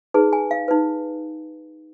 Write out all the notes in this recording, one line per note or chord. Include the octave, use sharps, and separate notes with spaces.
D#4 G#4 B4
G#5
F5
D#4 B4